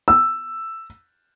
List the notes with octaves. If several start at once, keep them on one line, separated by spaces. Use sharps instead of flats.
E6